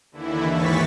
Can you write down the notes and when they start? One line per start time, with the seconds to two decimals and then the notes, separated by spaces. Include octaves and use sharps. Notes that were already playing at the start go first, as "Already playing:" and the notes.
0.11 D#2 D3 E3 E4
0.49 D#2 G#2 E3 C#6 A6 B6